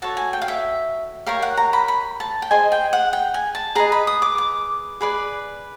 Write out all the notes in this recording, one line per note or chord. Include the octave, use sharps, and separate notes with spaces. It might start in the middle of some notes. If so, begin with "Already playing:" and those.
F#4 A4 C#5 A5
G#5
G5
F5
E5
G4 A#4 C#5 F5
F#5
A#5
B5
B5
A5
G5
G#4 C5 D#5 G#5
G5
F#5
G5
G#5
A5
G#4 B4 D#5 A#5
B5
D#6
D6
D6
G#4 B4 D5